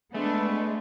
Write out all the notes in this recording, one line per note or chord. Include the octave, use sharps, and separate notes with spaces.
G#3 A3 B3 D4 B4